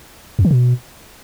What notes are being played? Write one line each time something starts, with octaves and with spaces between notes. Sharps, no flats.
F2
D#3
B2